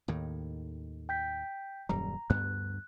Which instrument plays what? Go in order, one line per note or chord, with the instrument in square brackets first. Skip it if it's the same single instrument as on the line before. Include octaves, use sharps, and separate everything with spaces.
[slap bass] D#2 A2 D#3
[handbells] G5 G6 B6
[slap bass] D#1 F#2 G3 [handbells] A#5
[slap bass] D2 G2 B3 [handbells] F#6